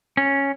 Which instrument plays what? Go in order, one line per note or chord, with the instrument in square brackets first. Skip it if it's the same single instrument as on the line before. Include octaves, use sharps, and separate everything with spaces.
[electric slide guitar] C#4